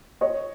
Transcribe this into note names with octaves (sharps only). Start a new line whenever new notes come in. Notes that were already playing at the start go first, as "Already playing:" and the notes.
C#5 D#5